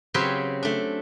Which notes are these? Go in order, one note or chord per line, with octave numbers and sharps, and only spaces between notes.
C#3 F#3 C4 G4 B4 C#5
A3 D4